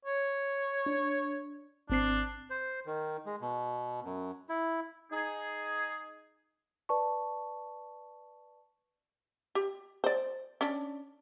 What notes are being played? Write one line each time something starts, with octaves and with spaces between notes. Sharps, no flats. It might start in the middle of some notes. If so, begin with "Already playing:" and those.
C#5
D4
G#1 C4 D4 C7
C5
D#3
G#3
B2
F#2
E4
D#4 G#4
B4 D5 A5 C#6
G4
C5 D5
C#4 D4